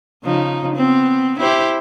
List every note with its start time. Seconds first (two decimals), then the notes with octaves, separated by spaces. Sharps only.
0.24 C#3 F3 D#4
0.76 B3 C4
1.40 E4 G4 C5